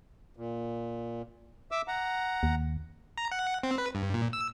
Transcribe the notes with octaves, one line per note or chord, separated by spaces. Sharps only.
A#2
E5 D6 E6
F#5 A#5
D#2
A#5
F#5
C4
B4
G2
A#2
E6